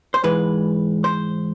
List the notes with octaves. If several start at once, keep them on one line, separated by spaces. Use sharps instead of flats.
C5
G#2 E3 G#3 B4
C5